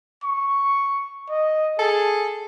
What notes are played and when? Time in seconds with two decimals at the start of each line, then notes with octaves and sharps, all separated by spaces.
0.24 C#6
1.30 D#5
1.79 G#4 A4